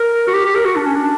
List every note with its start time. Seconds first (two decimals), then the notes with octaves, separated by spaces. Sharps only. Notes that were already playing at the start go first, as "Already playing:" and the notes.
Already playing: A#4
0.28 F#4
0.33 G4
0.45 G4
0.55 A#4
0.65 F#4
0.76 D4
0.87 C#4
0.97 D4